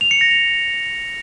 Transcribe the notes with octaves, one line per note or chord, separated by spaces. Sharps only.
F7
C#7
A#6
F7